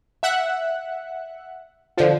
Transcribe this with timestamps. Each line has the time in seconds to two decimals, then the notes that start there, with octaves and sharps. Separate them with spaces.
0.23 E5 F#5 F#6
1.97 D3 F3